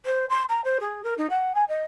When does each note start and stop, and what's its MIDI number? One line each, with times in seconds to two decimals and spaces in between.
0.05 0.25 72
0.29 0.43 84
0.49 0.61 82
0.64 0.78 72
0.80 1.01 68
1.03 1.14 70
1.17 1.27 63
1.30 1.52 78
1.54 1.64 80
1.68 1.85 75